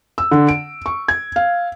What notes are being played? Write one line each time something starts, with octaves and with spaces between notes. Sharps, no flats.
E6
D3
D7
C#6
G#6
F5